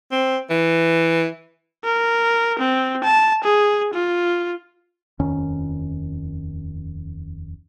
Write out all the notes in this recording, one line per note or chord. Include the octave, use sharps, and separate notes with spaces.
C4
E3
A#4
C4
A5
G#4
F4
D#1 F2 D#3 C#4